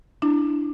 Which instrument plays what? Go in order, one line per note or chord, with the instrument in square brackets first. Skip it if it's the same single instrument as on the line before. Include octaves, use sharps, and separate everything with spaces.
[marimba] D4 E4